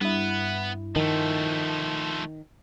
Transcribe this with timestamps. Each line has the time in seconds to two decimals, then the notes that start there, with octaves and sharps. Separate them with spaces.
0.01 G2 B3 E4
0.96 D#3 F3 A3